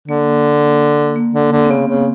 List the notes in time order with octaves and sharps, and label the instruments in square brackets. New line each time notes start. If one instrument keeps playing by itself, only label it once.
[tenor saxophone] D3 [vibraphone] A#3
[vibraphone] A#3
[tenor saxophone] D3
D3
[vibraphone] C4
[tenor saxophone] C#3 [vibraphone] B3
[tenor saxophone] C#3